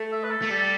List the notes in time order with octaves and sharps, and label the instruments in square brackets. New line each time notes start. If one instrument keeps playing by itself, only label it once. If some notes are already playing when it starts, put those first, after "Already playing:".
Already playing: [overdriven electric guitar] A3
[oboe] E5
B4
A4
[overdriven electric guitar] A3
[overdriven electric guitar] G3 [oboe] A4